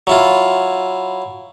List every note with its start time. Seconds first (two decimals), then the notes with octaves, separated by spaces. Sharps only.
0.07 F#3 E4 F4